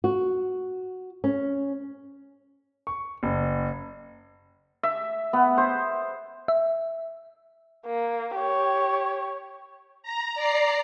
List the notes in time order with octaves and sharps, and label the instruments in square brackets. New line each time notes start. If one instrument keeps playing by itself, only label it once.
[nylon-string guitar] F#4
C#4
[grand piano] C#6
F#1
[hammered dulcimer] E5
B3
C5
[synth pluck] E5
[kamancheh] A#3
G4 C#5
[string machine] A#5
D5 A#5 C7